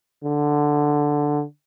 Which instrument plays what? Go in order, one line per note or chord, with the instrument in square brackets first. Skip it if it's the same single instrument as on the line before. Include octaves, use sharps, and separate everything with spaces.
[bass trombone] D3